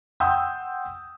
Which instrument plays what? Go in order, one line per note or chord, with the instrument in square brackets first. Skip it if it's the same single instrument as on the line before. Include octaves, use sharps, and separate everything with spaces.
[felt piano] F#5 G5 C6 D#6 E6 G6